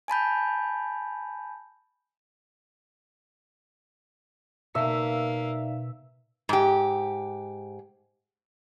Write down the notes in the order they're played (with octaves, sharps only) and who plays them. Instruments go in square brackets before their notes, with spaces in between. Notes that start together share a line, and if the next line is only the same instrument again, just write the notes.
[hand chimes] G#5 A5 B5 G6
[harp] B2 [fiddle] A#3 [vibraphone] D#4 D5 F5 [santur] E5
[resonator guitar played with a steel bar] G#2 G4